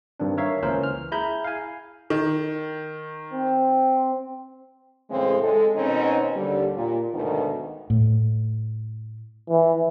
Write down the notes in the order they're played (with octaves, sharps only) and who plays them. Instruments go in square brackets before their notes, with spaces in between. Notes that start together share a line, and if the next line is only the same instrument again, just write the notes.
[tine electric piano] G2 D#3 C4 D4
A#4 C#5 E5 F5
C#2 E3 A#3 C#4 A#4 C5
F6
E4 G#4 A#5 B5 G6
F5 G#5
[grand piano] D#3
[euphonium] C4
[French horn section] A2 C#3 E3 G#3 C4
G#3 A4
B2 D#3 C4 C#4 D#4
D#2 D3 G3
A#2
D2 G#2 B2 D#3
[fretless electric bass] A2
[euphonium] E3